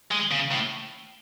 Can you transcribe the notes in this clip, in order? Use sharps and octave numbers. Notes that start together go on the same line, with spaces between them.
G#3
C#3
A2